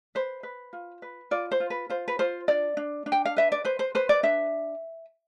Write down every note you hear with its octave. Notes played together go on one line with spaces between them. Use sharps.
B4 C5
B4
F4
B4
F4 D5
C5
F4
B4
F4 C5
B4
F4 C5
D4 D5
D4
D4
G5
F5
B4 E5
D5
B4 C5
C5
B4 C5
D5
D4 E5